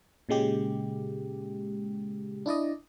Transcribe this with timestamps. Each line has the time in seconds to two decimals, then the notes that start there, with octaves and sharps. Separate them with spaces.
0.29 A#2 C#3 G#3 G4
2.46 D4 E4 D5 D#5